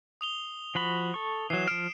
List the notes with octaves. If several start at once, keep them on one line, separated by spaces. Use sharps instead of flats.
D#6 F7 G7
F3 F#4 B5
A4 C#6
E3 F#3 C7 E7
F3 F6 D7